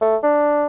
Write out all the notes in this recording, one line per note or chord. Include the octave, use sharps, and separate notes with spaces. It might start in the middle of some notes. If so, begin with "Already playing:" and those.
A3
D4